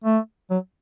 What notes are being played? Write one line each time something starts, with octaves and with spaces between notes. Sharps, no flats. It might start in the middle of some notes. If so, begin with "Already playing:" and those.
A3
F#3